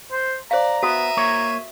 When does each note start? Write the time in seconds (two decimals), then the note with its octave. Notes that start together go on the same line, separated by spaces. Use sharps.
0.12 C5
0.51 C5 D5 F5 A#5
0.83 B3 F#4 E5 D#6 D#7
1.17 A#3 C#5